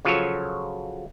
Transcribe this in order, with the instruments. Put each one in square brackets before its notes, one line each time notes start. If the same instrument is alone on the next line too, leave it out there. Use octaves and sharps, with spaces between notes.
[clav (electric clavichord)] C#3 F3 F#3 F4 A4 C#5